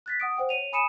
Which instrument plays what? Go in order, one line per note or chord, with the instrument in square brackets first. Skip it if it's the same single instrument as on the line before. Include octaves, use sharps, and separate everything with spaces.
[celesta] F#6 A6 B6
F#5 D#6 D7
C5 F#5 G5
C#5 D#7 F7
G#5 B5 D#6 C#7 D#7 E7